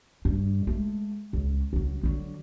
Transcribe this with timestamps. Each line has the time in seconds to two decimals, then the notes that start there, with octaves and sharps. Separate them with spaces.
0.25 G2
0.67 G#3 A3
1.33 C#2
1.73 C#2 F#3
2.03 D3 F#3